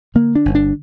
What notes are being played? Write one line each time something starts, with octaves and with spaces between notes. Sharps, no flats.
D3 A#3
D4
G1
D4